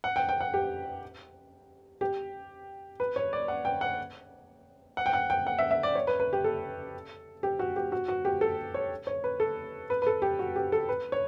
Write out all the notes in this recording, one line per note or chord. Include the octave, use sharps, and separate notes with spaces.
F#5
G5
G5
F#5
G4
G4
B4
C#5
D5
F#5
G5
F#5
F#5
G5
F#5
G5
F#5
E5
E5
D5
C#5
B4
B4
G4
A4
G4
F#4
G4
F#4
F#4
G4
A4
C#5
C#5
B4
A4
B4
B4
A4
G4
F#4
G4
A4
B4
C#5